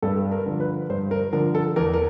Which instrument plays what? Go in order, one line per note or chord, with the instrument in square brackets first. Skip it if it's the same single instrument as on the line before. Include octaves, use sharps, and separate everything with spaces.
[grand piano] G2 A4
A#4
D3 F3
B4
G2 C5
A#4
D3 F3 A#4
A4
E2 A#4
A#4